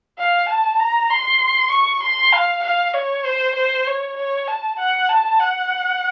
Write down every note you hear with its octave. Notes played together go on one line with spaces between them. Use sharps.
F5
A5
A#5
C6
C#6
C6
F5
F5
C#5
C5
C5
C#5
C#5
A5
F#5
A5
F#5